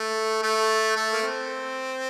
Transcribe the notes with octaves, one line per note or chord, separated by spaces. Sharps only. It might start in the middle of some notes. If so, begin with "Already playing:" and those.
Already playing: A3
A3
A3
A#3
C4